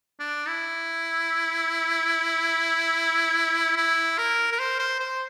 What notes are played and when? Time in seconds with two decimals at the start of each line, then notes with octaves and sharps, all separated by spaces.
0.20 D4
0.48 E4
3.76 E4
4.18 A#4
4.52 A#4
4.59 C5
4.79 C5
5.00 C5